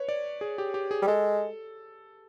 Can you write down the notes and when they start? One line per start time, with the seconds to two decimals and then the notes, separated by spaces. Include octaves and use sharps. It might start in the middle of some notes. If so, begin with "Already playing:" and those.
Already playing: B4 C#5
0.09 D5
0.41 G#4
0.58 G4
0.74 G4
0.91 G#4
1.02 G3
1.07 G#3 A4